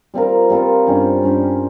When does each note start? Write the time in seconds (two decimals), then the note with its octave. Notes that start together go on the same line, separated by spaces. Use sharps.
0.14 G3 C4 F4 A#4
0.50 G3 C4 F4 A#4
0.87 G2 G3 C#4 G4
1.22 G2 G3 C#4 G4